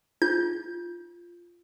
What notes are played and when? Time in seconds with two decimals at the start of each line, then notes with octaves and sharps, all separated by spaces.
0.22 F4 G6